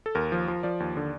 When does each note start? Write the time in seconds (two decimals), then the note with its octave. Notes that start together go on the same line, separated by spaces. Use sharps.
0.06 A4
0.15 D#2 A#4
0.32 F3
0.48 F3
0.63 F3 D5
0.80 D#2
0.97 D3